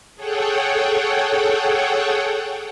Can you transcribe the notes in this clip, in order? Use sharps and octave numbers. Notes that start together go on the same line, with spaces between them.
G#4 A4 C#5 F#5 G5